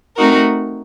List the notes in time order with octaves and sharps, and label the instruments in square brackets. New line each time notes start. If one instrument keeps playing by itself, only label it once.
[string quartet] A3 C4 D#4 F#4 A#4